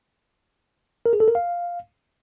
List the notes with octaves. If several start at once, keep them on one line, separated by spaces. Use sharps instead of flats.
A#4
G#4
A4
A#4
F5